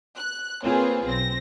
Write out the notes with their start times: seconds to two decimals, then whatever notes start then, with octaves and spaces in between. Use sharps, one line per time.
0.16 F#6
0.64 A#3 C4 F4 G#4 B4 C#5
1.05 B1 C4 A#6